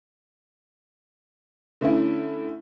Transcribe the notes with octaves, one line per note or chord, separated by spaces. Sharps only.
D3 A3 C#4 E4